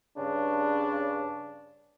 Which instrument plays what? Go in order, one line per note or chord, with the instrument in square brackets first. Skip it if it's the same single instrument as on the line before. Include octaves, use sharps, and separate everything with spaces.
[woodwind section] G2 C#3 [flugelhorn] D4